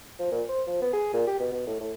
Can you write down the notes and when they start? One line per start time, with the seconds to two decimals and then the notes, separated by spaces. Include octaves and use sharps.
0.19 F3
0.32 A#2
0.49 C5
0.67 F3
0.82 B3
0.93 G#4
1.14 A#2
1.27 G4
1.40 B2
1.52 B2
1.67 A2
1.80 A2